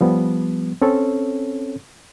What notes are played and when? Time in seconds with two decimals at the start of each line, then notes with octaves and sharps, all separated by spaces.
0.01 F3 G3 B3
0.82 C4 C#4 A4 C#5